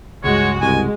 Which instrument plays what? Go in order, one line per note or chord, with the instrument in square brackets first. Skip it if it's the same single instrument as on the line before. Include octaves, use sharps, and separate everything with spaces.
[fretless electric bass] C#2 G2 [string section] G#3 F#4 [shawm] C#5
[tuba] C2 [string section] G#3 [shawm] G#5